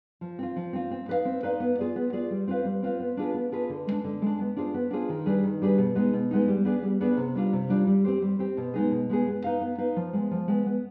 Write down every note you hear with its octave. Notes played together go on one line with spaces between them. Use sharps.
F3
C4 F4
F3
C4 F4
C4
D#4 B4 D5 F5
C4
D#4 B4 D5 F5
B3
F4 G#4 D5
B3
F4 G#4 D5
G3
C4 F4 B4 F5
G3
C4 F4 B4 F5
B3
D4 F4 G#4 B4
B3
D4 F4 G#4 B4
D3
G#3 D4
D3
G#3 D4
B3
D4 F4 G#4 C5
B3
D4 F4 G#4 C5
D#3
G3 D4 G#4 B4
D#3
G3 D4 G#4 B4
B2
G#3 B3 D#4
B2
G#3 B3 D#4
G3
B3 D4 G#4
G3
B3 D4 G#4
C3
G3 D4 F4
C3
G3 D4 F4
G3
C4 G4 C5
G3
C4 G4 C5
B2
G#3 B3 D#4 G#4
B2
G#3 B3 D#4 G#4
B3
D#4 B4 F5
B3
D#4 B4 F5
F3
G#3 B3
F3
G#3 B3
B3